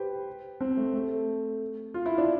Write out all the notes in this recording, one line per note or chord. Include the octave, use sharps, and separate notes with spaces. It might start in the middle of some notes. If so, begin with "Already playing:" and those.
Already playing: G4 B4 C5
C4
A3
A3
F4
E4
D4
E4